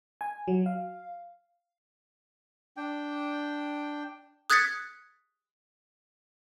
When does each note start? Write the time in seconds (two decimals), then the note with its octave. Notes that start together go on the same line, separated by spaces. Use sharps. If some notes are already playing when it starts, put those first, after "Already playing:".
0.21 G#5
0.48 F#3
0.66 F5
2.77 D4 G5
4.50 D#6 F#6 G#6 A6 B6 C#7